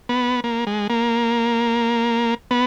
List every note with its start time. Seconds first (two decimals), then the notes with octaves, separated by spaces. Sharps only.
0.09 B3
0.44 A#3
0.67 G#3
0.90 A#3
2.51 B3